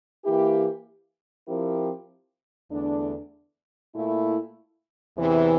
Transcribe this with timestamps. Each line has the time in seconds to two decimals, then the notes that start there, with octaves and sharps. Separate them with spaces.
0.24 E3 A#3 E4 G4
1.47 F3 C4 E4 G4 A#4
2.70 E2 D3 A3 D4
3.94 A#2 A3 E4
5.17 E2 C3 E3